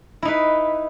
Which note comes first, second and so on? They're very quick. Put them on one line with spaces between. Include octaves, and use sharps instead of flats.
E4 D#4 B4